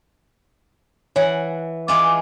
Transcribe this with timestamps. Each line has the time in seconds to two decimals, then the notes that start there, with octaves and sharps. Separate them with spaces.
1.16 E3 C#5 F#5
1.88 E3 G#3 F4 D6